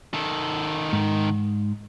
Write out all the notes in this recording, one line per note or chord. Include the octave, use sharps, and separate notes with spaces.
D#3 A4
G#2